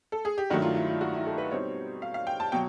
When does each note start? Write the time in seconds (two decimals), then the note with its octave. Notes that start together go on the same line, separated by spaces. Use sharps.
0.12 A4
0.25 G#4
0.38 G4
0.50 G2 D#3 F#3 A3 D4 F#4
0.62 F4
0.75 E4
0.88 F4
1.01 F#4
1.14 E4
1.26 A4
1.38 B4
1.51 B2 G3 C4 D#4 C#5
2.02 F5
2.14 F5
2.27 G5
2.40 A5
2.52 B2 F#3 G5